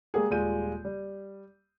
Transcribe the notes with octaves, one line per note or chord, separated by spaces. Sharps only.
G3 G#3 A#3 G4 G#4
D#1 G3 G#3 F4 G6 D#7
G3